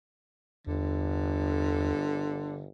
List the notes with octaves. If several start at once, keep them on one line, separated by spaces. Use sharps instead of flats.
G1 E2 D3